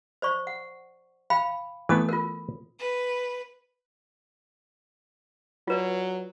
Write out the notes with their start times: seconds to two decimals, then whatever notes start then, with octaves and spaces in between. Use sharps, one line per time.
0.22 C5 D5 C#6
0.47 F#5
1.30 F5 G5 B5
1.89 E3 A3 B3 A4 D#6
2.09 F4 A#4
2.80 B4
5.68 F#3 F4 B4 D5